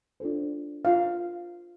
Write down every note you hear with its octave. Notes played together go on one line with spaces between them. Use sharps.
D4 F4 A4 C5
F4 C5 F5